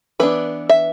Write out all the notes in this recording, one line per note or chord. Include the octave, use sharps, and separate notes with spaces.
E3 B3 D4 B4
E5